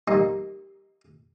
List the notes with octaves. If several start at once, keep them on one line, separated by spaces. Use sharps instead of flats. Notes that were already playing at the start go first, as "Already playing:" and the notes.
G3 A#3 D#4